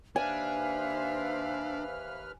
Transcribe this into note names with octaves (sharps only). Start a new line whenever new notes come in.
D#2 D4 B4 C5 E5 F5 G#5 F6